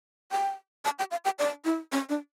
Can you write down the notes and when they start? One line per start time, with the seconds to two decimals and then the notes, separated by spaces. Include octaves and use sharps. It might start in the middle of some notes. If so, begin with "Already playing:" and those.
0.32 G5
0.85 A5
0.99 G5
1.11 F5
1.25 G5
1.39 D5
1.65 E4
1.92 C#4
2.09 D4